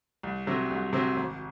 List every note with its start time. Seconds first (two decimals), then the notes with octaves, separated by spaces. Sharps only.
0.23 C2
0.47 C3 F#3 C4
0.70 C2
0.93 C3 F#3 C4
1.16 G#1